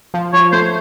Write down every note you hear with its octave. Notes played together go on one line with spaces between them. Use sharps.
F3
F3 C#5
A3 C5